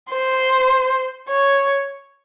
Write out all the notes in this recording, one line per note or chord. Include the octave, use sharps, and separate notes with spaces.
C5
C#5